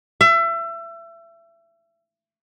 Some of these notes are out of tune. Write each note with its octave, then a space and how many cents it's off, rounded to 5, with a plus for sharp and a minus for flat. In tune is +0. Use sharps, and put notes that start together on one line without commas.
E5 +30